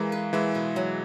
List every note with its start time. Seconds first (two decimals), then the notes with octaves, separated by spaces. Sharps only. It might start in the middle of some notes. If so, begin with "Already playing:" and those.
Already playing: E3 G#3 A#3
0.12 B4
0.33 E3 G#3 E4
0.55 B2
0.76 F#3